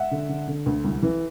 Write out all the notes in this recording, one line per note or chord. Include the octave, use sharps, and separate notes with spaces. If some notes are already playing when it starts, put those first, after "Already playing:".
Already playing: E5 F#5
D3
D3
D3
D2
C2
E3